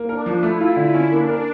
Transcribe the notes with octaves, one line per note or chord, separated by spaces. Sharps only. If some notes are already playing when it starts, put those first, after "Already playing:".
Already playing: A#3
D4 A#4
F3
A3 E4
F4
D3 E4
C#4
A#3 D4
A#4